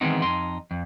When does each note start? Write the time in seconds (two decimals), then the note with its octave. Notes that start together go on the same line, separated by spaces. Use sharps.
0.01 D#3 E3 G#3 B3 C4 D#4
0.22 F2 D#4 C6
0.71 F2